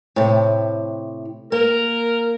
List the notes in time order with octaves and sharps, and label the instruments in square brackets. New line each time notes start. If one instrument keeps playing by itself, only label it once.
[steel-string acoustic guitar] A2 C3
[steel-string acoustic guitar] A#3 [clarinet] A#4